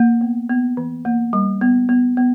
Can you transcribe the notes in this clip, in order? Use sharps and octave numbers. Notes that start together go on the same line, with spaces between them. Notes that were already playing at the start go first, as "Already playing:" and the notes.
Already playing: A#3
B3
B3
E3
A#3
G3
B3
B3
B3